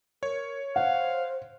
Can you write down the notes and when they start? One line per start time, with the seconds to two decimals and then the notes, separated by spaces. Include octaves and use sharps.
0.23 A#4 C#5
0.76 C5 F5 F#5